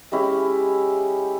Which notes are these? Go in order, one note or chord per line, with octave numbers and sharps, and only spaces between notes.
G#3 C#4 E4 G4